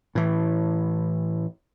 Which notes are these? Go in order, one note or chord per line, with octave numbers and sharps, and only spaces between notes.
A2 E3